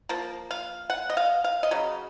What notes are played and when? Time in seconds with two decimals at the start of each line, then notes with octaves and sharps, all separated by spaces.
0.09 F3 A#3
0.51 F5
0.90 F#5
1.10 D#5
1.17 F5
1.44 F5
1.63 D#5
1.71 C#3 F#3